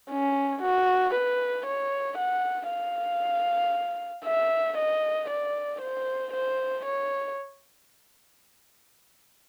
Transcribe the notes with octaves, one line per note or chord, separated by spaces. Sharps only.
C#4
F#4
B4
C#5
F#5
F5
E5
D#5
D5
C5
C5
C#5